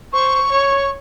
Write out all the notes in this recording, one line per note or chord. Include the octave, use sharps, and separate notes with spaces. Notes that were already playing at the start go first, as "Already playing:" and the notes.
C5 C#6
C#5